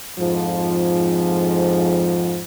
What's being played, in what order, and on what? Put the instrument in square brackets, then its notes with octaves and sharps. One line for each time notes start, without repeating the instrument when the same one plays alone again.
[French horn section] F2 G#2 F3